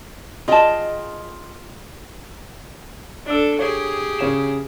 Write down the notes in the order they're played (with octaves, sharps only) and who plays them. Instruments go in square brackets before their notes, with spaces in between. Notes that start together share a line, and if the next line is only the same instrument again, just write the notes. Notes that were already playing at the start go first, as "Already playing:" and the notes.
[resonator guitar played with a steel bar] F4 D#5 G5 [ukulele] G#4 A5
[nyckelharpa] D4 A4 [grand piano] D5 E6
[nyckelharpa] G4 G#4 [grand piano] C#5
[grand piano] C#3 C#5 E7